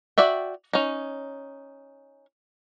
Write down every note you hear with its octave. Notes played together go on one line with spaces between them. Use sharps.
F#4 D5 E5 G5
C#4 D#4